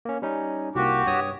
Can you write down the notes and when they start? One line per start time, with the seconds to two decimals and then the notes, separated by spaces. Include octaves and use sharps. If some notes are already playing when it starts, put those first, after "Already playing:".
0.05 A#3 C#4
0.22 G3 C#4 D#4
0.75 C2 A#3 F#4 G4
1.07 G2 C#5 D#6